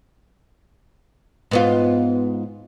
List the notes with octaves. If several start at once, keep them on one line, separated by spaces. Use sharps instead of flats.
G#2 B3 F4